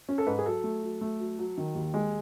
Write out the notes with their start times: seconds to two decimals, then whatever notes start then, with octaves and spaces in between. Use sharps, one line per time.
0.09 C#4
0.18 A4
0.27 G#2 B4
0.39 G#4
0.46 F#3 A4
0.64 A3
0.83 F#3
1.01 A3
1.20 F#3
1.39 F#3
1.58 D#3
1.75 D#2
1.94 G#3